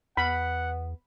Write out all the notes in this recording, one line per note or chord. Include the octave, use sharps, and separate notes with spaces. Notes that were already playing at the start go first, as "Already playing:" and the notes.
E2 B3 F#5 B5